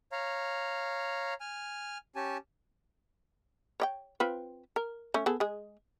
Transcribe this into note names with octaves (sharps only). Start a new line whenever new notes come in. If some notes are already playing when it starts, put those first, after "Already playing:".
C#5 F5 A#5
G#5 F6
C#4 G4 G#5 A5
C#5 D5 G5
C4 F4 B4
A#4
A3 C#4
B3 G#4 A4
G#3 G#4